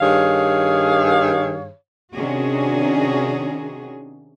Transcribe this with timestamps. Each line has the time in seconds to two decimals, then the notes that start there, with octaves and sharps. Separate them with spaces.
0.01 G2 D#3 G#4 C#5 F5
2.15 C3 D#3 C#4 D4 F#4 G#4